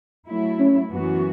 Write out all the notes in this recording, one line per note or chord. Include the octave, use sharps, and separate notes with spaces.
F#3 A3 E4
C#4
F#2 E3 B3 F#4